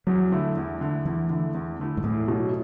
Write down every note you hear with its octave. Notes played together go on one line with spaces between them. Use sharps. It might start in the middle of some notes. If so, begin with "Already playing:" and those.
E2 F#3
D3 A3 E4
E2
D3 A3 E4
E2 E3
D3 A3 E4
E2
D3 A3 E4
G#2
E2 A2
B2 F#3